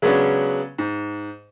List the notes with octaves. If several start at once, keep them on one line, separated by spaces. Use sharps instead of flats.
C#3 F#3 G#3 B3 C#4 D4
G#2